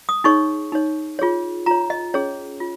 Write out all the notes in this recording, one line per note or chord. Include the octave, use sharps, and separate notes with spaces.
D#6
D#4 G#4 C#5 C#6
D#4 C#5
F4 G#4 C#5
F4 C#5 A#5
D#5
C#4 G#4 C#5
F4